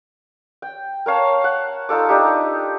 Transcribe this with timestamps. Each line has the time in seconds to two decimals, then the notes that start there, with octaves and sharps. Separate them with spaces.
0.62 G5
1.06 A#4 C#5 F5 A5
1.44 F#5
1.89 D#4 F4 A4 D6
2.09 D4 D#4 G4